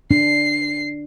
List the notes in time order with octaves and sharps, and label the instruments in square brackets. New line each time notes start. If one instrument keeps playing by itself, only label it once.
[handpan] D4 [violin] C7